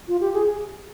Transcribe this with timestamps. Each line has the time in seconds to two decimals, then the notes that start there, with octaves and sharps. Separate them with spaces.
0.08 F4
0.21 G4
0.34 G#4